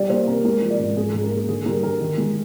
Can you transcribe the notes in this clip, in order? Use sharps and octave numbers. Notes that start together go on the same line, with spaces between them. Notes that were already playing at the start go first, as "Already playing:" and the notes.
Already playing: G3 D5
A#3 C5
C3 A#4
G#3 A#4
F3
D5
G#2
G#2 G#4
G#4
G#2
A#4
A#3
G#4
D3 G#4
G3 A#4
D3 A#4
D#3
G#3